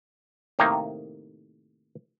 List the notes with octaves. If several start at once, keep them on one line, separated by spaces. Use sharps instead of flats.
A2 C3 D#3 A#3 D#4